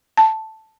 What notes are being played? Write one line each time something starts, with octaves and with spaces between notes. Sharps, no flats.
A5